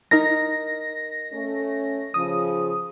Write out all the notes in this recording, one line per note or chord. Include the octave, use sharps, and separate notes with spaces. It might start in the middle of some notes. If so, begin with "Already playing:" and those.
D#4 A#4 A#6
A3 C#4
C#3 F3 D#6